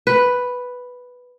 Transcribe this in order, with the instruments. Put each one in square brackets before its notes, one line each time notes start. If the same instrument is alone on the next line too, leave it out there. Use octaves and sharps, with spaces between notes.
[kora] B4